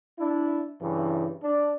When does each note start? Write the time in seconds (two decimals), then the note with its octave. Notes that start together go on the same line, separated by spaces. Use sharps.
0.19 D4 E4
0.81 G2 C#3 E3
1.43 D4